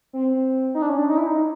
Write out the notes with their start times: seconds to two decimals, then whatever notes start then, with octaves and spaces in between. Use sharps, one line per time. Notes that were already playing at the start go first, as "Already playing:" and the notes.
0.13 C4
0.75 D#4
0.82 D4
0.89 C#4
0.99 D4
1.09 D#4
1.18 E4
1.27 D#4